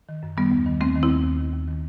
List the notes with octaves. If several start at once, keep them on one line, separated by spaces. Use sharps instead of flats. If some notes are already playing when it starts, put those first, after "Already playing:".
D#3
F#2
D#3 G3 B3
D#2
D#3
D#2 A3 C4
D#3
C4 E4
D#2
D#2
D#3
D#2
D#3